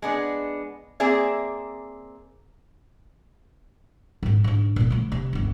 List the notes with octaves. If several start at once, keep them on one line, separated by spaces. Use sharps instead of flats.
G#3 B3 D4
A#3 C4 G#4 D5 E5
G#2 F3
G#2 D4
A#2 D3
F3 A3
C3
G1 C#2